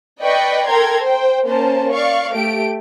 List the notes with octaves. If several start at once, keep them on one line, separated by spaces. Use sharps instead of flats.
B4 D5 D#5 G5 B5 C#6
A4 A#4 G5 A#5 C6 G#6
C5 G5
A#3 C#4 A#4 C5 A5
D5 F5 C#6
A3 G4 D7